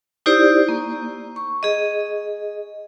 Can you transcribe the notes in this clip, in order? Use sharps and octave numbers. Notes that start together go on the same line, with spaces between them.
D#4 E4 G4 C5 D5
A#3
C#6
G#4 D#5